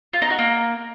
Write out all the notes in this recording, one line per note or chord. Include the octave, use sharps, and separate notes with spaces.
F4
D#4
F#4
A#3